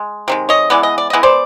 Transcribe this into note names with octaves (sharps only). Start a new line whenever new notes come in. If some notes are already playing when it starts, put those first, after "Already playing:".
Already playing: G#3
C3 D#3 G#3
C#5 D#5
E3 G#3 B3 D5
D#5
D5
E3 G#3 B3 D#5
C5 D5